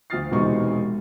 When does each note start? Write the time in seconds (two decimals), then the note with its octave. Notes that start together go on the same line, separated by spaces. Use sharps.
0.10 D2 F3 D#6 F6 A6 C7
0.31 E1 E2 C3 G#3 D#4 C#6